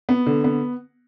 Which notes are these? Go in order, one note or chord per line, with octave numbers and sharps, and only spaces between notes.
B3
D3
B3